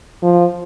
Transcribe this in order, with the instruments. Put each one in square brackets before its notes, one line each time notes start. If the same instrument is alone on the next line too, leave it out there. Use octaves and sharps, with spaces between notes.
[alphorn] F3